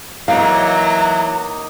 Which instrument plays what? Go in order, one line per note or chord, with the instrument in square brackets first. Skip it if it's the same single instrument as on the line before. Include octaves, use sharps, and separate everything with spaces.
[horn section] E3 F#3 [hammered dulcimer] A#3 D#4 [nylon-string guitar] F5 [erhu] A#5